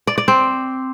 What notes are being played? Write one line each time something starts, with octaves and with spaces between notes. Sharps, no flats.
D5
D5
C4